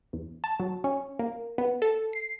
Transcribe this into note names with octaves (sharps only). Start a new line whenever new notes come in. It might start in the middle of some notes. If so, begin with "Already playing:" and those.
E2
A5
F#3
C#4
A#3
B3
A4
C7